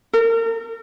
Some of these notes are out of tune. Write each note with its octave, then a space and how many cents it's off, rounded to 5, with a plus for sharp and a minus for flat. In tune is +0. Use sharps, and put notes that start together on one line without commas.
A#4 -35